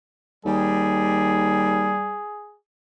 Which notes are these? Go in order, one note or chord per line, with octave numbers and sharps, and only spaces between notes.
D#2 G3 G#4